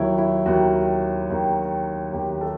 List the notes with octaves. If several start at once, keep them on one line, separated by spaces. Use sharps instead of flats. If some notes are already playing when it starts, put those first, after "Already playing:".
Already playing: D#2 D#3 F#3 E4
E4
D#2 D#3 F#4
D#2 D#3
D#2 D#3 G4
A4